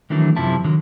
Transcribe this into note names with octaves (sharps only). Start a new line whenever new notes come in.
D#3 E3 F#3 A3 D4
F#2 C3 F3 E4 A5
D3 D#3 F#3